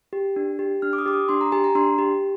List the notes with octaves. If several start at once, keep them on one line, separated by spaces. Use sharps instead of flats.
G4
D4
G4
D4 F6
D6
D#6
G4 D6
D#6
D4 C6
A#5
G4 G#5
A#5
D4 C6
G4